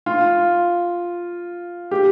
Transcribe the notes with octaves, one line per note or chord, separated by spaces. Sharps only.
F4
G4